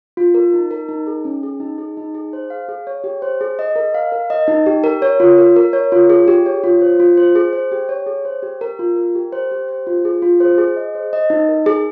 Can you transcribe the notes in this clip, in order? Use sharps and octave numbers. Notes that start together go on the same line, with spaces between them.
F4
A#4
D#4
A#4
D#4
G#4
C#4
G#4
D#4
G#4
D#4
G#4
C5
F5
G#4
C#5
G4
C5
G#4
D#5
A#4
F5
A#4
D#5
D#4
G4
A#4
C#5
F4
A#4
A#4
C#5
F4
G#4
G4
C#5
F4
C5
F4
C5
G#4
C5
G4
C#5
G#4
C5
G4
A#4
F4
A#4
G4
C5
G4
C5
F4
G#4
F4
C5
G#4
D#5
C5
D#5
D#4
A#4
G#4